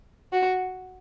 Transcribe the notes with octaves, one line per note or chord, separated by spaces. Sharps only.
F#4